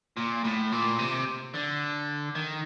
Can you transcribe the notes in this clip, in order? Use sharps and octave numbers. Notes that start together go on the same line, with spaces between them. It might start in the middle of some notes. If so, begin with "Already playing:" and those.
A#2
A2
A#2
C3
D3
D#3